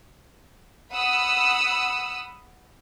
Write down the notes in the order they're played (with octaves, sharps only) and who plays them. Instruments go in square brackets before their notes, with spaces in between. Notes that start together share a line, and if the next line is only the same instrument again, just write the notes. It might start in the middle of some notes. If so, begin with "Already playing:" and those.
[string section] F#5 B5 D#6 E6